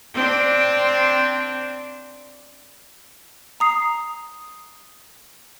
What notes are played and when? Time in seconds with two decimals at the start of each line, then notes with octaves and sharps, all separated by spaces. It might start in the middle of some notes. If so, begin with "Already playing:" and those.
0.14 C4 D4
3.60 A#5 D#6 C7